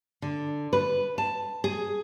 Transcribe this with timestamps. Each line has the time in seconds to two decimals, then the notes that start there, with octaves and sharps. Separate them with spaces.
0.22 D3
0.73 B4
1.18 A5
1.64 G#4